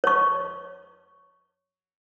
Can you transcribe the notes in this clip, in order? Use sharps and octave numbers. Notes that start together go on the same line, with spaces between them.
C#5 C#6